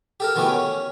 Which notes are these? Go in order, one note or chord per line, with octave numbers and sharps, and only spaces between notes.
G4 A4 A#4
B2 D#3 E3 A3 G4 D6
C#4